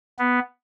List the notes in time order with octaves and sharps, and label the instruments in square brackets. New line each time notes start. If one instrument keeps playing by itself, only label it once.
[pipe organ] B3